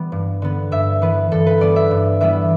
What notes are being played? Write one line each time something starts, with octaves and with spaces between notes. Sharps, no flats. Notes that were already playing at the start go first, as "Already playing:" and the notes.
Already playing: E3 G3 B3
G2
D3 B3
G2 E5
E3 B3 B4
G2 A4
B4
G3 B3 D5
E5
G2
E3 G3 B3 E5